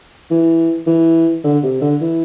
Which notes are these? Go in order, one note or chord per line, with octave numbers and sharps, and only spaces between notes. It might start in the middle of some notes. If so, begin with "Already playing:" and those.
E3
E3
D3
C3
D3
E3